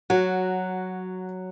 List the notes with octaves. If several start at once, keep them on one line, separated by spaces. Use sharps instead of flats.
F#3 F#4